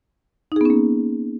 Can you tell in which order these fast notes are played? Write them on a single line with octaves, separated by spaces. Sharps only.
D#4 G#4 B3 C#4 A#3